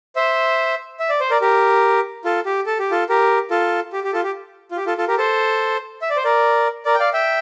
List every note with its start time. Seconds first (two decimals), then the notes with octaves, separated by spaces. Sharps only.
0.16 C5 E5
1.00 E5
1.09 D5
1.20 C5
1.30 A#4 D5
1.41 G4 A#4
2.25 F4 A4
2.46 G4
2.66 A4
2.79 G4
2.91 F4 A4
3.09 G4 A#4
3.50 F4 A4
3.93 G4
4.04 G4
4.13 F4 A4
4.24 G4
4.71 F4
4.77 G4
4.86 F4 A4
4.98 F4 A4
5.08 G4 A#4
5.18 A4 C5
6.02 E5
6.10 D5
6.16 C5
6.24 A#4 D5
6.85 A#4 D5
6.95 G5
7.00 D5 F5
7.13 E5 G5